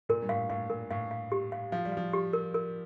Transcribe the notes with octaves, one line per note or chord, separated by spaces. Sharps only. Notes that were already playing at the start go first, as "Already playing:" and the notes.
A#2 A#4
G2
A2 F5
A2 F5
A#2 A#4
A2 F5
F5
G4
F5
F3 F5
G3
F3 F5
G4
A#4
A#4